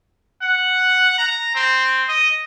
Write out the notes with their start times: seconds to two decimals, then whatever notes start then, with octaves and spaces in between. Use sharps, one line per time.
0.42 F#5
1.18 A#5
1.55 C4
2.08 D#5